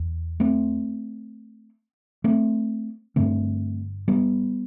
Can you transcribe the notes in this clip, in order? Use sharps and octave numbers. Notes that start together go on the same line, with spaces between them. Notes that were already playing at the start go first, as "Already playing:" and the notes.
Already playing: E2
A3 C4
A3 C4
G2 D3 A3 C4
G3 B3